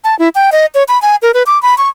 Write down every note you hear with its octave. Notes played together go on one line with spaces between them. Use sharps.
A5
E4
G5
D#5
C#5
B5
G#5
A#4
B4
D6
B5
C#6